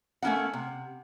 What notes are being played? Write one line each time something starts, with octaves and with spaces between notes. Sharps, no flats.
A3 A#3 C#4 E4 F#5
C3